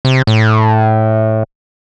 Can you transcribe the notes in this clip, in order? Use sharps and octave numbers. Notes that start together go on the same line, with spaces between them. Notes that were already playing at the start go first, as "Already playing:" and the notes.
C3
A2